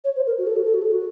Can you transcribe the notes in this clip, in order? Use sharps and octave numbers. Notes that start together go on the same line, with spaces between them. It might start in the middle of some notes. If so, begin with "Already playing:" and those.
C#5
C5
A#4
F#4
A4
F#4
A4
F#4
A4
F#4